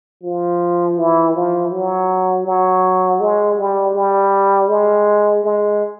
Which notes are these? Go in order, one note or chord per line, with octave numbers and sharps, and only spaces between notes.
F3
E3
F3
F#3
F#3
G#3
G3
G3
G#3
G#3